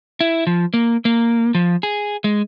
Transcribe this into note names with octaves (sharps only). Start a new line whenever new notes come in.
E4
F3
A#3
A#3
F3
G#4
G#3